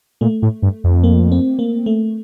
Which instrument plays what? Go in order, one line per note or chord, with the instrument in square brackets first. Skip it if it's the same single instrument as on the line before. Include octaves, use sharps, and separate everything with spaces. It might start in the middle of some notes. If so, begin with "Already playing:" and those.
[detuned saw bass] A#2 [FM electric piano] A3
[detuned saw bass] A2
G2
F2
[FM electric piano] A#3
C4
A#3
A3